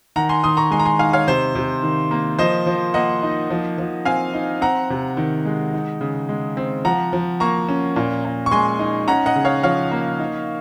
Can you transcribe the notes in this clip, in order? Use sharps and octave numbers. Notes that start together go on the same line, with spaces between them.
D#3 F#5 A#5
G#5 C6
D#3 C6 D#6
A#5 C#6
G#3 G#5 C6
A#5
G#5 C6
D#4 F5 G#5
C#5 F5
C3 C5
C3
D#3
A#3
F3 C5 D#5
F3
A#3 D#5 F#5
D#4
F3
F3
C4 F5 G#5
D#4
C4 F#5 A#5
C3
D#3
G#3
D#4
C#3
G#3
C4
F3 F#5 A#5
F3
A#3 A#5 C#6
C#4
A#2
A#2
C#6
G#3 G#5 C6
D#4
C#4 F#5 A#5
D#5 F#5
C#3
C#5 F5
F3 C#5 F5
A#3
D#4